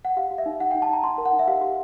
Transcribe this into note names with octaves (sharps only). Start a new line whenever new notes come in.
F#5
G4 F5
G4
E5
D#4
D#4 F#5
D#4 G5
A5
D#4 A#5
D#4 C6
A#4
F#5
D#4
E5
G4 F5
G4